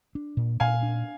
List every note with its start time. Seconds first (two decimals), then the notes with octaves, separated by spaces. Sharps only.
0.15 D4
0.37 A#2
0.60 A#2 F5 G#5
0.83 D4